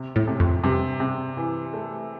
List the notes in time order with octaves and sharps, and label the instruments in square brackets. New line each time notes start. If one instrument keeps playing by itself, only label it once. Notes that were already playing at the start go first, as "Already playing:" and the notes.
Already playing: [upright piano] C3
[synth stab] A2
[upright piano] C3
[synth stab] F2
[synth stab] G2 [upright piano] C3
[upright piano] C3
E3
A3